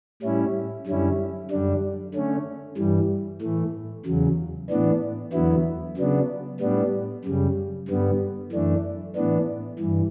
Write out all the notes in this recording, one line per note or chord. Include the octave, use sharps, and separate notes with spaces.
A2 G3 C#4 E4
F#2 D3 G3 C#4 E4
F#2 D3 G3 D4
D3 A3 C#4
G2 E3 G3
A2 E3 A3
E2 C#3 F#3
A2 E3 B3 D4
E2 D3 F#3 B3 E4
C#3 F#3 B3 D4
A2 G3 B3 D4
F#2 C#3 G3
G2 D3 G3 B3
F#2 E3 A3 D4
A2 E3 B3 D4
G2 E3